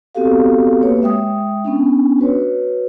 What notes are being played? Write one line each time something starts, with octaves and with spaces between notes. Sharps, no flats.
B3 C4 F#4 G4 A4 F5
A#3 G4 B4 C#5
G#3 E5 G5 D#6
B3 C#4 D4
F#4 B4 C#5